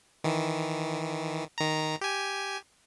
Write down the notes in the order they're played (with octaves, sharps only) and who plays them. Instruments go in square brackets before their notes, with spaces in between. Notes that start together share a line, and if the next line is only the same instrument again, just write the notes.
[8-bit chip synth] D#3 E3
D#3 A#5
G4 G#5